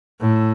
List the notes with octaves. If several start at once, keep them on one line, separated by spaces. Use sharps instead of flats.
A2